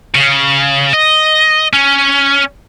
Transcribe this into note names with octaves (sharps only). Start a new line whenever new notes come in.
C#3
D#5
C#4